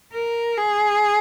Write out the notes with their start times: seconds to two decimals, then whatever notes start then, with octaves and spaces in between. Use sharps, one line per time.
0.13 A#4
0.58 G#4